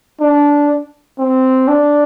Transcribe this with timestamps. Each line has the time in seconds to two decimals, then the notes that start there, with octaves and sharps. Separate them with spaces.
0.20 D4
1.19 C4
1.68 D4